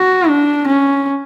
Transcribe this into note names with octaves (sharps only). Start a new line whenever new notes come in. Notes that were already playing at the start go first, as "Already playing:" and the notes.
Already playing: F#4
D4
C#4